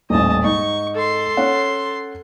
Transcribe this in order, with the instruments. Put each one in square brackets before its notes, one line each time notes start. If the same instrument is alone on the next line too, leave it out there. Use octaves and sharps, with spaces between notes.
[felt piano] D#1 A1 [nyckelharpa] D#5 A5
[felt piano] G#2 D#4 [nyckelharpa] C#6
[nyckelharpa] A4 C6
[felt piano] C#4 C#5 F#5